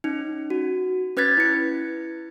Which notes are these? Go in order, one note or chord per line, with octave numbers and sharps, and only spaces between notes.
C#4 D#4
F#4
C#4 B4 F#6 G#6 A6 B6
E4 C#7